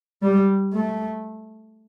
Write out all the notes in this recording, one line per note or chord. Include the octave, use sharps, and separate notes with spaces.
G3
A3